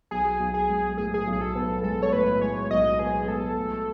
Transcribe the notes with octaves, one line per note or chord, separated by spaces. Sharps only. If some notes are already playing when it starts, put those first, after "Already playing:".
B1 G#4
B1
G#4
G#3
A2 G#4
G#4
B1
G#4
A4
B3
G#3 A4
C#5
A2 B4
G#3 C#5
B1 D#5
B3 G#4
G#3 A4
A3